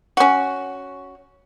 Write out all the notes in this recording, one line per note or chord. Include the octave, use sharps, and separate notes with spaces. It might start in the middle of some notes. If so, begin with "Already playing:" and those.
C#4 F#4